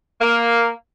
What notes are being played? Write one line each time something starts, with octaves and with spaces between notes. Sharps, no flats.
A#3